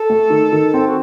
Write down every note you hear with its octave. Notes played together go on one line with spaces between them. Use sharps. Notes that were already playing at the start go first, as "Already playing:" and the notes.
Already playing: A4
A3
D#3
D#3
C4
F#4